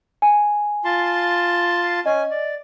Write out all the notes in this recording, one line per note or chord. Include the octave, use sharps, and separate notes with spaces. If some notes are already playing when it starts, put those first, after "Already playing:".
G#5
F4 A5 C6
C#4 D#5 G#5
D5